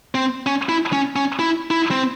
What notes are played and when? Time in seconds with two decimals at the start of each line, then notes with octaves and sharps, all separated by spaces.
0.15 C4
0.46 C#4
0.69 E4
0.93 C#4
1.16 C#4
1.39 E4
1.71 E4
1.91 C4